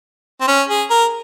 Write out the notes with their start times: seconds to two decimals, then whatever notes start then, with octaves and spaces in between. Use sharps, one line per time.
0.41 C4
0.48 C#4
0.68 G#4
0.90 A#4